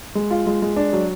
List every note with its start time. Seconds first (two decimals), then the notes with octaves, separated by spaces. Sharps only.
0.15 G#3
0.31 F4
0.47 G#3
0.62 G#3
0.76 D4
0.93 F#3